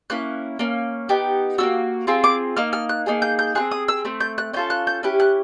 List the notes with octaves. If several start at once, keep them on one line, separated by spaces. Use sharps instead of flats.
A#3 C#4 E4 F#6
A#3 C#4
B3 D#4 G4
A#3 C#4 F#4 E6
C4 F4 G#4
D6
A#3 D#4 F6
F6
F#6
A#3 D#4 G#4
G6
G6
C4 F4 G#4 F#6
D#6
E6
A3 C4
G6
F#6
C#4 F4 A4 G6
F#6
G6
C#4 E4 G4 F#6
F#6